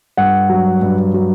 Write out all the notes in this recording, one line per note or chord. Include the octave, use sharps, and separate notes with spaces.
G2 F#5
F#3
G2
F#3